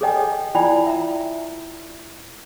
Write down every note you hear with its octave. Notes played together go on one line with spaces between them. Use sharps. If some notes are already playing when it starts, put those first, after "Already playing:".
G#4 A4 C#5 D#5 G5 G#5
E4 F4 D5 G5 G#5 B5
E5 A#5